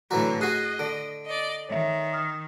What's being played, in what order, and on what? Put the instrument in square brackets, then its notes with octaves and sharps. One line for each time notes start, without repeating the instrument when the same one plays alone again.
[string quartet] A2 D3 [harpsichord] E3 F#3 F#4 [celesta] A#5
[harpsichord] F#4 G#4 [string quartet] D#5 [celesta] F#6 C7 D#7
[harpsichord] D3 [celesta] D7
[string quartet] D5 D#5
[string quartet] D#3 [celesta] C#5 E5
[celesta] D#6 F6